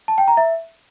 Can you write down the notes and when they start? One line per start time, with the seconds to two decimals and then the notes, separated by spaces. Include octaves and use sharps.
0.08 A5
0.18 G5
0.28 A#5
0.37 E5